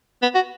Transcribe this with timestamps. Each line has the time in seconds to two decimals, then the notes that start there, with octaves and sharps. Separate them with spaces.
0.22 B3
0.35 F#4